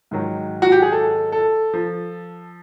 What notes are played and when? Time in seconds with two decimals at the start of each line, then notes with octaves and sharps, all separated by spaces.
0.11 G#2 D#3 F#3
0.62 F#4
0.72 G4
0.82 G#4
0.92 A4
1.32 A4
1.73 F3